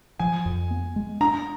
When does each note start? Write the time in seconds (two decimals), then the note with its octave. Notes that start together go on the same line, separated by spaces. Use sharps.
0.20 F3 G#5
0.46 F2
0.71 B3
0.96 G#3
1.21 D4 A#5